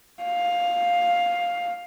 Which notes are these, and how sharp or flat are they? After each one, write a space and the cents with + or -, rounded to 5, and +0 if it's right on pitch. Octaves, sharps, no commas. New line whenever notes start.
F5 +10